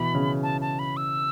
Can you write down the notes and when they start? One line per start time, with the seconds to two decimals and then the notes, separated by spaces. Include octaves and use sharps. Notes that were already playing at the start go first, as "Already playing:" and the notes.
Already playing: B2 E3 B5
0.15 C#3
0.43 A5
0.61 A5
0.79 B5
0.97 E6